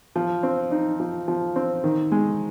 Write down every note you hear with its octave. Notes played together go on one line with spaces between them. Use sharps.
F3
C4
D#4
F3
F3
C4
D#3
G#3